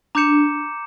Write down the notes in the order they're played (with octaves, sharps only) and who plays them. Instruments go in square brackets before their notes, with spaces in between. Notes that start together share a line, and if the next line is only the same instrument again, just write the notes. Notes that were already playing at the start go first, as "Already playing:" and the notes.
[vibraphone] D4 [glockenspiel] A#5 D6 G6 C#7 E7